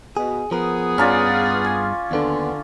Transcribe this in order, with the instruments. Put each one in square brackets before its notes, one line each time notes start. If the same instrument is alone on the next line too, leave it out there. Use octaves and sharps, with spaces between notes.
[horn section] B2 [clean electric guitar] G#4
[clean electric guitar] F3 A#4 [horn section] B3 G#4
[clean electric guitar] G2 A#5 [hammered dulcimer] C#4 F4 D5
[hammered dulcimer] G#5
[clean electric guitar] D#2 B3 D4 [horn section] D3